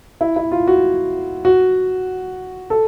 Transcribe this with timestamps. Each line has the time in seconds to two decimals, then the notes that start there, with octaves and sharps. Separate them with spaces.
0.21 E4
0.36 E4
0.52 F4
0.68 F#4
1.45 F#4
2.70 A4